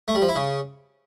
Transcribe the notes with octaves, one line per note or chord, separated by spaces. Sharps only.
A3
G3
F3
E4
C#3